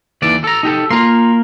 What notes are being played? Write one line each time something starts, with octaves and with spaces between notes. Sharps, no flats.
D#2 E3 D5
A4 A#5
D#4 G4 A4
A#3 F4 A#4 C6